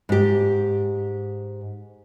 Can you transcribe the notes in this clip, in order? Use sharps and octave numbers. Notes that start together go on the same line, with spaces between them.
G#2 G4